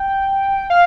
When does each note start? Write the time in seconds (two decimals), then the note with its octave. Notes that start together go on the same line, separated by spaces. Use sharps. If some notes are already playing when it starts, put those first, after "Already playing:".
Already playing: G5
0.70 F5